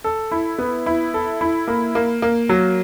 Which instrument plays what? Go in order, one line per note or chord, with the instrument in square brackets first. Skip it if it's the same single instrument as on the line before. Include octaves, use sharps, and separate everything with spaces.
[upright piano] A4
E4
B3
E4
A4
E4
A#3
A#3
A#3
F#3